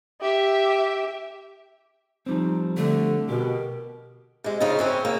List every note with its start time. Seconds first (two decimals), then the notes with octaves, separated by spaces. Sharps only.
0.21 G4 E5
2.26 F3 G3 C4 D#4
2.77 D3 A3
3.29 B2 G4 A#4
4.44 C3 G#3
4.60 C#3 C4 D#4 F4
4.79 E3 C4 C#4
5.05 C#3 A#3